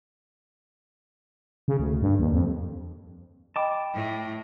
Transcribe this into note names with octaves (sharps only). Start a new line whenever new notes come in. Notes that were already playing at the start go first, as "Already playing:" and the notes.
C#3
D2
G2
D#2
F2
D#5 G5 A5 B5 D6
A2